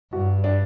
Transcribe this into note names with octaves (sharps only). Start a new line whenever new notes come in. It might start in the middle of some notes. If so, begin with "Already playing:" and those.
G2 F#4
D4